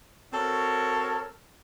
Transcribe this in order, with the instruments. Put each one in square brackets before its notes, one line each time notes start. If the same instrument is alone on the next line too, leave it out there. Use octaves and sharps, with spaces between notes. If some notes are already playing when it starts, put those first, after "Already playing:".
[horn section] C4 F#4 A4 A#4 C#5